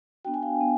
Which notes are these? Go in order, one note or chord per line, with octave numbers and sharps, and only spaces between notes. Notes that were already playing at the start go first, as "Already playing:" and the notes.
B3 D4 F#4 G5
G#5
F5 G5
B3